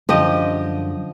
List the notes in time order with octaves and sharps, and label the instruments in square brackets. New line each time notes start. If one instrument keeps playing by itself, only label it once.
[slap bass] F#2 D3 G3 [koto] F3 G4 D#5